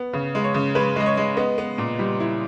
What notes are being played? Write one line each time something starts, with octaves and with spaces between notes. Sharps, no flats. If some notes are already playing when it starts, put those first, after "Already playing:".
Already playing: B3
C#3
G#3
C#5
C#3
G#3 B4
G#3 D#5
C#5
G#3
B3 D#5
B3
A#2
G3
E4